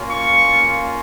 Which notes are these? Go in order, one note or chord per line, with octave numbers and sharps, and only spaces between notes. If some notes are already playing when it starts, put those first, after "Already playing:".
Already playing: A#3 C#4 F4
C#6